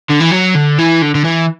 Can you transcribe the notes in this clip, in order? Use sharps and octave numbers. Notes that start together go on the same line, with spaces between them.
D3
E3
F#3
D3
E3
D3
D3
E3